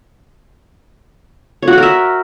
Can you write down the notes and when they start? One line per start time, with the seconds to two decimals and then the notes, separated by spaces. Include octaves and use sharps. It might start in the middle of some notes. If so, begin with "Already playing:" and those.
1.62 C#5
1.68 F#4
1.73 F#5
1.78 A#4
1.83 E5